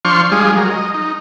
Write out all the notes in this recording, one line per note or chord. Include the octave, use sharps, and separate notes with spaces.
F3 D4 C5 C6 C#6 F6
G3 G#3 F4 G#4
F#3 A#4
D#5
D#4